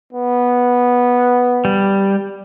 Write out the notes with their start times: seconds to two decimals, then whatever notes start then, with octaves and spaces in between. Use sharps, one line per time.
0.13 B3
1.65 G3